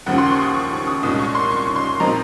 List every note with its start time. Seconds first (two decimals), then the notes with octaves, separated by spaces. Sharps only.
0.06 D#2 C#3 F3 F#5
0.18 C6
0.30 C#6
0.42 D#6
0.54 C#6
0.71 C#6
0.87 D#6
1.03 C2 A#2 G#3 C#4 D#6
1.19 C#6
1.35 C6
1.51 C#6
1.76 C6
2.00 A#2 F3 C4 D#4 A#5